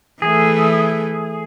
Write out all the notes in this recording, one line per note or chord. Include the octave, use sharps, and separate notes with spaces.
E3 A3 G#4